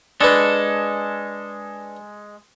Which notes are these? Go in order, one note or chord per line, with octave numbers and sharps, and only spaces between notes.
G#3 D4 A4 B4